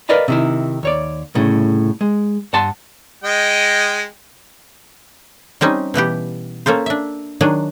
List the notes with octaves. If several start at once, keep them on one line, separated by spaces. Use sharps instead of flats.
A#4 B4 D5 D#5 F5 B5
C3 D#3 E4
D#2 C#5 D5
C2 A2 C#3
G#3
G2 F#5 A5 C6
G#3 D#5 G5
G3 C4 C#4 D#4
B2 E3 B3 G4
A#3 C#4 A4 C5
D4 E5
D#3 F#3 D4 G#4